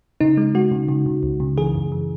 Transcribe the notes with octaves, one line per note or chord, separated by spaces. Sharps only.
C#3 D#4
G#3
G#3 F#4
C#3
C#3
C#3
C#2
C#3
E3 G#4
F#2
E3